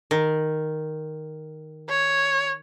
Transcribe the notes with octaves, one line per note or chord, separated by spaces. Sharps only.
D#3
C#5